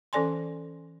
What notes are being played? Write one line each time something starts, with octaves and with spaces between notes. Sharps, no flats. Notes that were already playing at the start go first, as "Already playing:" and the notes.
E3 C#4 A4 D5 G#5 C6